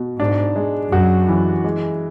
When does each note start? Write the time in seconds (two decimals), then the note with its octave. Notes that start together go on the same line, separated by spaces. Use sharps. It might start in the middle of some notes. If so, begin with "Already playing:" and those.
Already playing: B2
0.19 G#2 D4
0.56 G#3
0.92 F#2 F#4
1.29 E3
1.64 G#3